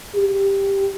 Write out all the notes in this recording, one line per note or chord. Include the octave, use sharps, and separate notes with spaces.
G4